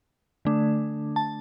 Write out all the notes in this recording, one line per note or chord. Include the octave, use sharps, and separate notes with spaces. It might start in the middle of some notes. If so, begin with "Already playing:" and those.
D3 A3 D4
A5